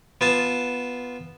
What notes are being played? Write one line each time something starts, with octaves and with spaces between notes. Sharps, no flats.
B3 F4 G#5 A5